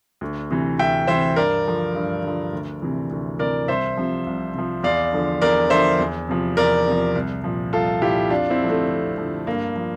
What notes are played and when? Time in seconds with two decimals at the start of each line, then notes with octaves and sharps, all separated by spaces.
0.21 D2
0.51 C3 E3
0.79 D2 E5 G5
1.08 C3 E3 C5 E5
1.36 G2 A#4 D5
1.66 D3 F3
1.95 G2
2.24 D3 F3
2.53 D2
2.82 C3 E3
3.11 D2
3.39 C3 E3 A#4 D5
3.68 C2 C5 E5
3.97 C3 F3
4.27 C2
4.54 C3 F3
4.83 E2 D5 F5
5.13 D3 F3
5.42 E2 A#4 D5
5.70 D3 F3 C5 E5
5.99 E2
6.29 C3 F3
6.57 E2 A#4 D5
6.86 C3 F3
7.15 C2
7.44 A#2 F3
7.73 C2 F4 A4
8.02 A#2 F3 E4 G4
8.30 F2 D4 F4
8.50 C4 E4
8.60 D3 F3
8.69 A3 C4
8.89 F2
9.18 D3 F3
9.46 G2 A#3
9.76 F3